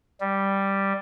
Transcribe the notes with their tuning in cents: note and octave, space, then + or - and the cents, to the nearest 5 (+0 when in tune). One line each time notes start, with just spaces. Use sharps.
G3 +0